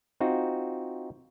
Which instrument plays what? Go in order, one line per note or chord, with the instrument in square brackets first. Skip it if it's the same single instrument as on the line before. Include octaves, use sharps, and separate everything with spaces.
[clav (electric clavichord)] C4 D#4 F4 F#4